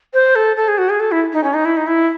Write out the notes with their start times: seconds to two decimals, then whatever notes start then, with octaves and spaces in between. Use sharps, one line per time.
0.14 C5
0.35 A4
0.56 A4
0.68 G#4
0.78 F#4
0.89 G#4
1.00 A4
1.11 E4
1.33 D#4
1.44 C#4
1.54 D#4
1.65 E4
1.77 D#4
1.87 E4